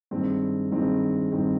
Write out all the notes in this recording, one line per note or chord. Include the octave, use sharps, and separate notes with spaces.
G2 D#3 G#3 C4
G2 D#3 G#3 C4
G2 D#3 G#3 C4